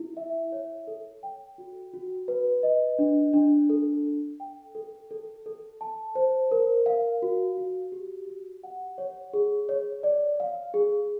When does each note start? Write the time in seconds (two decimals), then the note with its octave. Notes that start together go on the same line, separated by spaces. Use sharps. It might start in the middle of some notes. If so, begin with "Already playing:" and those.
Already playing: E4
0.17 E5
0.52 C#5
0.87 A4
1.23 G5
1.58 F#4
1.93 F#4
2.28 B4
2.63 D#5
2.99 D4
3.33 D4
3.69 A4
4.04 A4
4.40 G5
4.75 A4
5.11 A4
5.46 A4
5.81 A5
6.15 C5
6.51 A#4
6.86 F5
7.22 F#4
7.57 F#4
7.92 G4
8.28 G4
8.64 F#5
8.98 C#5
9.34 G#4
9.69 C#5
10.03 D5
10.40 F5
10.74 G#4